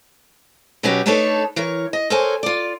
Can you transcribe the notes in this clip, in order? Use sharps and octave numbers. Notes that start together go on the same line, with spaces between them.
B2 F#3 B3 C#4 F#4 G4
A3 D4 D#4 A4 B4 C#5
E3 A#4 C#5
D#5
A4 A#4 C5 C#5 G#5
F4 D5